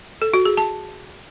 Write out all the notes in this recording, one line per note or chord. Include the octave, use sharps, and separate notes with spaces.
A4
F#4
G#4
A5